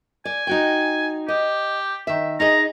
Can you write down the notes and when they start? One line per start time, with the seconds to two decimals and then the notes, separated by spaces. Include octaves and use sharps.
0.25 D5 G#5
0.47 D#4 F#4 G5
1.28 G4 D#5
2.07 D#3 E5
2.40 D#4 G#4 D#5 A#5